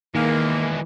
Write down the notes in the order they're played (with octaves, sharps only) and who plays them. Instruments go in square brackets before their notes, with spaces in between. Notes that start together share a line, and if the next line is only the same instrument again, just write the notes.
[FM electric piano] D#3 [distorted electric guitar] E3 G#3 [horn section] A#3